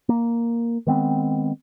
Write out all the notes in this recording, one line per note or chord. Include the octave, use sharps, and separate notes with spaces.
A#3
D#3 G#3 B3 C4